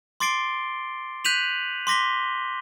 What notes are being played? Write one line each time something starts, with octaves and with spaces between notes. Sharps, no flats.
C6 D6 A6 C7 D7 G7
F#6 G6 B6 D#7 F7 F#7
C6 D6 A#6 B6 G7